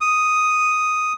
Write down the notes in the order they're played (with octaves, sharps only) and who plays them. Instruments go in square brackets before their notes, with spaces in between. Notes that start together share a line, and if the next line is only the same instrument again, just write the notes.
[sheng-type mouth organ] D#6